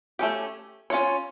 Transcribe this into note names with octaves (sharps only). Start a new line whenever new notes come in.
A3 C#4 G4
C#4 F4 C#5